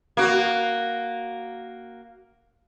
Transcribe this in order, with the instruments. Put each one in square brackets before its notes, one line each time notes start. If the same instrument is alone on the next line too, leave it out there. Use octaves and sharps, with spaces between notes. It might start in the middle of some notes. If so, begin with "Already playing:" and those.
[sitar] A#3 F#4